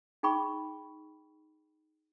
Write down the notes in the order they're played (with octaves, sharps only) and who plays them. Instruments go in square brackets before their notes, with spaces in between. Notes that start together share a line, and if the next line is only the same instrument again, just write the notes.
[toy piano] D#4 G#4 G5 B5 C#6